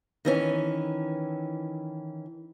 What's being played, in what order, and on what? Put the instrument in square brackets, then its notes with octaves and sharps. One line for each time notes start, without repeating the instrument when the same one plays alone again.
[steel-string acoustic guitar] D#3 E3 C#4